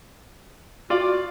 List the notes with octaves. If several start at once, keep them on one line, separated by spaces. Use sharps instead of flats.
F4 F#4 D5